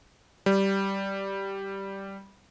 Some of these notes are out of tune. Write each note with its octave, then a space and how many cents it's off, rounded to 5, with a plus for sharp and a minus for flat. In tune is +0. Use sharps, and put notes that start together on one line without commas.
G3 -5